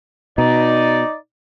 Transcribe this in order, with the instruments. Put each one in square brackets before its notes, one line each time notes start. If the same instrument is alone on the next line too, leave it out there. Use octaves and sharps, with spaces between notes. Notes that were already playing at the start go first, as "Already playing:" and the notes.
[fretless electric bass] B2 [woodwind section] D#4 D5